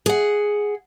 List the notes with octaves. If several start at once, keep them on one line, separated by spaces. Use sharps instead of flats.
G#4 F#5